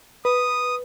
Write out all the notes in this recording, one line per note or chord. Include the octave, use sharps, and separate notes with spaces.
B4 D#6